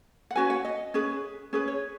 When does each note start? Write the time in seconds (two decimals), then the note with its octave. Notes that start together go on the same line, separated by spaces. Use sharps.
0.31 F#5
0.35 C#4 F#4 B4 G#5
0.50 F#5
0.65 D#5
0.94 C#4 G#4 B4
1.53 C#4 G#4 B4
1.68 C#5